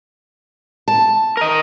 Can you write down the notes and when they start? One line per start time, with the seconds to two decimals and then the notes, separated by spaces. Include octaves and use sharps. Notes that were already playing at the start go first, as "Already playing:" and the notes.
0.88 A5
1.37 A#4 D#5